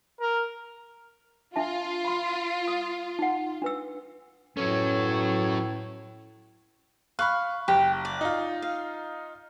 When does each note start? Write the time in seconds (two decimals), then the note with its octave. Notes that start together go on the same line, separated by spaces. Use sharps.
0.21 A#4
1.56 D4 F4 E5 A5
2.05 B5 C6
2.68 D#6
3.19 D#4 F#5
3.62 D4 B4 E6
4.57 A2 F#3 B3 C#4 A4 C#5
7.19 F5 B5 C#6 F#6
7.68 F#1 G4
8.05 D5
8.21 D#4 F4
8.62 F5